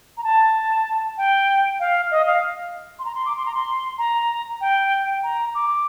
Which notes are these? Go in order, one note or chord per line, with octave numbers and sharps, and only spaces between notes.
A#5
A5
G5
F5
D#5
F5
C6
A#5
C6
D6
C6
A#5
C6
A#5
G5
A#5
D6